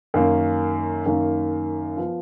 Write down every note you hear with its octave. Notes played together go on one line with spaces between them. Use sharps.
F#2 D#3 A#3
F#2 D#3 A#3
F3 B3 F4